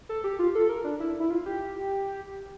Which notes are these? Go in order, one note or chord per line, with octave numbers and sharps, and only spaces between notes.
A4
G4
F4
A4
A#4
D4
E4
E4
F4
G4